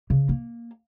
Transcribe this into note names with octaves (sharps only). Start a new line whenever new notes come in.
C#3
A#3